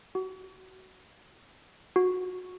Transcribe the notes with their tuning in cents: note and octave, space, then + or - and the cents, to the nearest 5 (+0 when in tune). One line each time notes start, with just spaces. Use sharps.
F#4 +20
F#4 -20